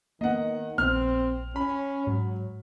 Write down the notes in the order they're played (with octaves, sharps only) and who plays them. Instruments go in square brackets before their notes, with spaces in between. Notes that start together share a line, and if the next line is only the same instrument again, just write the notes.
[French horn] D#3 [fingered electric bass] A#3 B3 [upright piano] D#5 F#5
[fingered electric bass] A#1 B3 [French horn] C4 [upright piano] F6
[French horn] C#4 [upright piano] B5
[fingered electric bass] G#2 [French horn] F#3